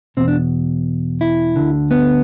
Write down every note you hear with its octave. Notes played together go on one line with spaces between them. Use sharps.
E2 B2 C4
D4
E4
D2 D3
B3